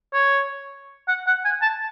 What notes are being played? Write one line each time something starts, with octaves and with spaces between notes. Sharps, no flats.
C#5
F#5
F#5
G#5
A5